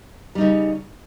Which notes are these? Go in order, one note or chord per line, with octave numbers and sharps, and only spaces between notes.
C#3 G3 D#4